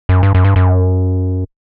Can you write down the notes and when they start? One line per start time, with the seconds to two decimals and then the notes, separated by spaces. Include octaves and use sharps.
0.09 F#2
0.23 G2
0.35 F#2
0.45 G2
0.56 F#2